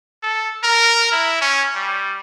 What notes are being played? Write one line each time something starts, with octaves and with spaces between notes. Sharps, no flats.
A4
A#4
E4
C#4
G3